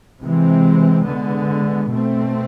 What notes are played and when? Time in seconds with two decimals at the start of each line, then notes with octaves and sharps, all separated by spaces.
0.20 C3 E3 G#3 C4
1.06 D3 G#3 B3
1.91 B2 A3 C4